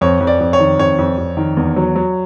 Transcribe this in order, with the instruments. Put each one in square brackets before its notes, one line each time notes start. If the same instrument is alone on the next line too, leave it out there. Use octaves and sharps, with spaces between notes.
[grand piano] F2 [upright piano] C#5
[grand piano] F2
[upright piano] D5
[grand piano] F2
[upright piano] C#5
[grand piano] D#3
[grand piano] F2 [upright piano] C#5
[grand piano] F2
F2
D#3
E2
F#3
F#3